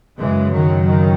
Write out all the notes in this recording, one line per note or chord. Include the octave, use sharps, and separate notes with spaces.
F#2 C#3 E3 G#3
D#3 F#3
D#3